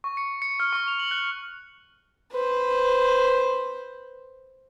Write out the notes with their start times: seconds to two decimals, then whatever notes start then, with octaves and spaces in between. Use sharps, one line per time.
0.04 C#6
0.17 C#7
0.42 C#7
0.60 F6
0.73 C#6
0.88 F7
1.00 F#7
1.11 F#6
2.32 B4 C5